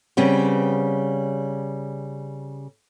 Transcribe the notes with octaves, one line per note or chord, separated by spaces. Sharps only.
C#3 G3 B3 C4